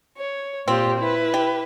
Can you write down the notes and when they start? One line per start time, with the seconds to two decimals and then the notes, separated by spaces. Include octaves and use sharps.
0.17 C#5
0.68 A#2 C4 F4 G4
0.99 E4 B4
1.34 G4